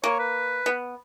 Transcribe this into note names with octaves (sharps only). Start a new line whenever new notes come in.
A#3 C#5
B4
B3